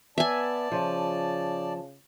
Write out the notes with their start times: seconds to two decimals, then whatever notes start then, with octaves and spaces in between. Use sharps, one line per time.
0.18 B3 D5 E5 G#5 A5
0.72 C#3 F3